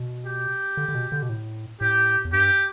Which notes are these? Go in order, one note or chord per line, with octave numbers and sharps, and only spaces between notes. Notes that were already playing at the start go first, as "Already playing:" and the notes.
Already playing: B2
G4
D3
D3
B2
D3
B2
A2
A2 G4
E2
G2 G4